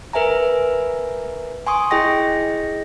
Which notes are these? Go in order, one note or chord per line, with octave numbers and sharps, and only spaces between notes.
A#4 B4 E5 G#5 A#5
G#5 C6 C#6 D#6
E4 G#4 D#5 G5 A#6